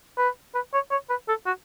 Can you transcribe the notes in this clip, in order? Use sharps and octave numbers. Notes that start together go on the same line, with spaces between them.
B4
B4
C#5
C#5
B4
A4
F#4